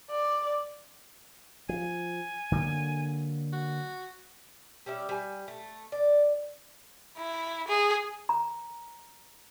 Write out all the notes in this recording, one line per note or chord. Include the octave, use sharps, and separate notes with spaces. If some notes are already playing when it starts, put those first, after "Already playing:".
D5
F3 G#5
D3 F#3 A#3
F#4
G3 C#4 D5 E5
G3 G#5
A3
D5
E4
G#4
A#5